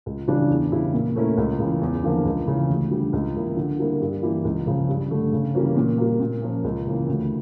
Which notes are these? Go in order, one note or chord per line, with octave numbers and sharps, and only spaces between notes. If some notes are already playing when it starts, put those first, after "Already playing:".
C#2
C#3 E3 G3 D4
E2
C#3 G3 C#4 E4
A#2
A3 C#4 E4 A#4
C#2
C#3 E3
E2
D3 F3 A#3
C#2
C#3 E3
D2
D3 G3
C#2
C#3 E3 A#3 E4
D3
G3 A#3 E4 A#4
G2
E3 A#3 E4 G4
C#2
C#3 F3
G2
D3 A3
C#3
E3 G3 A#3 C#4
A#2
G3 A#3
A#2
F3 A#3 C#4
C#2
C#3 E3 A#3
D2